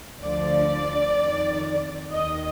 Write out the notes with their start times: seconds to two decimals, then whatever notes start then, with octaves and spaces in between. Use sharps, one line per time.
0.21 D2 D3 F3 D5
1.16 F2 D#3
2.12 D#2 D#3 D#5